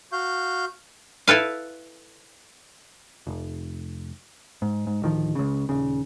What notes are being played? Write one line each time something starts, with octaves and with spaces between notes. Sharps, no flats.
F#4 F5 G6
E4 A4 B4 F5
F1
G#2
G#2
D1 D#3 F3
C#2 C#3
D#1 C#3